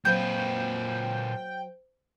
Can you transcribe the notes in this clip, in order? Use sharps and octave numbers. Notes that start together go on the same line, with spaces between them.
A#2 F#3 B4 C5 F5 G5 G6